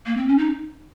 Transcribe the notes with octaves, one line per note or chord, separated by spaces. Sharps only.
A#3
C4
C#4
D#4